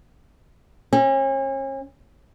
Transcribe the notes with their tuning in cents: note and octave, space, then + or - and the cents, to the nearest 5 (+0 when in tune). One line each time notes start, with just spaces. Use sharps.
C#4 -40